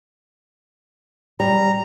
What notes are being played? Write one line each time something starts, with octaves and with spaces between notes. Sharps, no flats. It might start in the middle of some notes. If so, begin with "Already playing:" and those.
G3 A#5